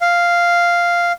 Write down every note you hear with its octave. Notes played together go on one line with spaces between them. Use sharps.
F5